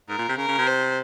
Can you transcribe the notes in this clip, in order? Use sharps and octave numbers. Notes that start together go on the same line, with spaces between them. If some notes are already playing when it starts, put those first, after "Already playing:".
G#2 A#4
A#2
C3
C#3 A#4
C#3
C3
C5